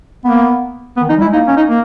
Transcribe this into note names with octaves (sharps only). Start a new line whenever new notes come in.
A#3 B3
B3
D#3
E3 D#4
G3
E4
G#3
A#3 D#4
C#4
D#4
A#3